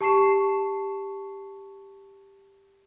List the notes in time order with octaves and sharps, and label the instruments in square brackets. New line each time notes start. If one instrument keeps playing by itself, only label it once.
[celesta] G4 A5 C#6 C7 E7